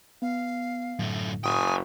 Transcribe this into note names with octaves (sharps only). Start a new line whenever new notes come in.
B3 F5
F#2 A2 D3 A3
F#1 G5 G#5 D#6